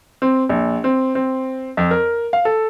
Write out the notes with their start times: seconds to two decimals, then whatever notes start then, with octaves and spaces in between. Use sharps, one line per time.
0.22 C4
0.49 A#1
0.84 C4
1.15 C4
1.77 F2
1.91 A#4
2.33 F5
2.45 A4